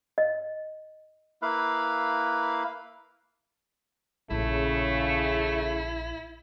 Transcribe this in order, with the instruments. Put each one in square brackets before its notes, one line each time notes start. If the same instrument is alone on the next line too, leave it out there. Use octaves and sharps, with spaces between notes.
[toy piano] D#5
[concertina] A#3 E4 B4 F5
[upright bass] A#1 [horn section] C#3 [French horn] A3 [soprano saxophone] E4